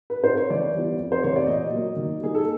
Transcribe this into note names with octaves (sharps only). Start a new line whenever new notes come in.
B4
C5
C#5
E3 D5
G3 B3 E4
F2
C5
C3 E3 C#5
D5
A#2 D#5
F#3 A#3
D#3
G3 A#3 D#4 G#4
A4